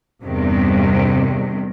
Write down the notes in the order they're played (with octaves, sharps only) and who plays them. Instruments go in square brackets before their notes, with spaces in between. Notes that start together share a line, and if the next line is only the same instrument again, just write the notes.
[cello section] E2 G2 C3 D#3